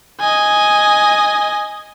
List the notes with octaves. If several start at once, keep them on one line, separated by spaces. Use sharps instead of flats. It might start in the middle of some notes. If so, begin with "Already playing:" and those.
D#5 G#5